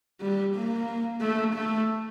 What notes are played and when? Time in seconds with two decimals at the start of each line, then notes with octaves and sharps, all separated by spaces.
0.21 G3
0.54 A#3
1.21 A3
1.54 A3